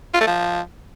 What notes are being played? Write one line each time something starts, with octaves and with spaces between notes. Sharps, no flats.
F4
A3
F3